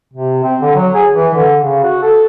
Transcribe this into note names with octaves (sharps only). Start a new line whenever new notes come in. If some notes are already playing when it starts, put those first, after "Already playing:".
C3
C4
D3
F#3
G#4
E3
D3
C#3
F#4
A4